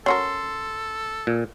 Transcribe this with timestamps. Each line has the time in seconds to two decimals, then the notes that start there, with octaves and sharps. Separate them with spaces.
0.06 C#4 F#4 A4 A#4 C6
1.27 A#2